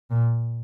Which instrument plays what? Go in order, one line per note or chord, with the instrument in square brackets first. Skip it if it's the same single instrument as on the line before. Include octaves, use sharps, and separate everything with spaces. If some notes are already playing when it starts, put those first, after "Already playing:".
[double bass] A#2